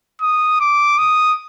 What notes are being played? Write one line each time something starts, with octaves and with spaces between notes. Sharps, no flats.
D#6
D6
D#6